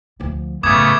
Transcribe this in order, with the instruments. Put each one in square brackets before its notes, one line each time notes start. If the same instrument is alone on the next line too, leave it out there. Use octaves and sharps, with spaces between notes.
[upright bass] D2 F3
[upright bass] A1 F#2 [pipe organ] C#3 A3 B3 [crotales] D6 D#6 G#6